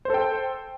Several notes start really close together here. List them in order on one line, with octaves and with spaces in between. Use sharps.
C5 A4 G5